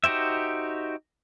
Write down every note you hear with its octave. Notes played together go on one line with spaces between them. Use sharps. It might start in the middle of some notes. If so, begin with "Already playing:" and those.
D#4 F#4 G4 C5 E5